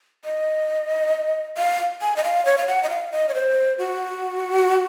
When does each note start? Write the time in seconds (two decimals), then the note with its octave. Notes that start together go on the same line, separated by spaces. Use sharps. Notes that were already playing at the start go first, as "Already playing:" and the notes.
0.25 D#5
1.57 F5
2.01 G#5
2.16 D#5
2.24 F5
2.45 C#5
2.58 F5
2.67 F#5
2.83 D#5
2.90 F5
3.12 D#5
3.29 C#5
3.34 C5
3.78 F#4